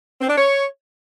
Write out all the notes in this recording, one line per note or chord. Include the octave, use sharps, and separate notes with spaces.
C4
D4
C#5